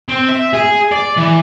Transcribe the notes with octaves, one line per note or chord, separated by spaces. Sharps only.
C4
E5
G#4
D5
E3